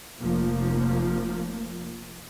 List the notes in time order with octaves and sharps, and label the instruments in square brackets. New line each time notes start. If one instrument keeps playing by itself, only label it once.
[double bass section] F1 F3 A#3